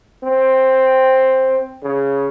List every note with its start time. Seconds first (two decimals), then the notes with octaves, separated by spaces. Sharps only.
0.24 C4
1.82 C#3